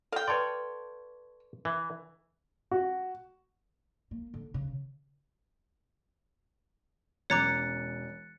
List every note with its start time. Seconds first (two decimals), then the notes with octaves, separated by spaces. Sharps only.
0.12 A4 F5 G5
0.28 B4 C#5 D5 A5 C6
1.65 E3
2.71 F#4
4.11 A#3
4.34 D3
4.54 C#3
7.30 E1 C#4 C#5 A#5 D6 F#6 A6 C#7